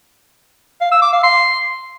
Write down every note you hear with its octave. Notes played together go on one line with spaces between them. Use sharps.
F5
E6
D6
F5
C6